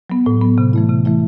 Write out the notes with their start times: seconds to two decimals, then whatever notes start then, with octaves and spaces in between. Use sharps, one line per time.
0.10 F#3 B3
0.26 A2
0.42 F#3 B3
0.58 C3
0.73 E3 A3 E4
0.89 C3
1.05 E3 A3 E4